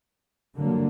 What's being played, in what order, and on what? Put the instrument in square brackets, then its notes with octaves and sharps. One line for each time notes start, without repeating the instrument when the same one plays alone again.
[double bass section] G2 D3 F#3 A#3